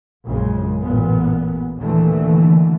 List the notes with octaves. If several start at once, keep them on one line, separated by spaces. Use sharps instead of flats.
A#1 F#2 C#3 G#3
A1 A#2 B3
D#2 A#2 D3 E3 A3